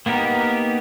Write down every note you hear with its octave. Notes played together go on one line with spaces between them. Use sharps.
A#3 B3 D#4 G4 A#4